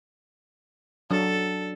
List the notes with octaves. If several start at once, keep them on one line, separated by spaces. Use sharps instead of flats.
F#3 D4 A4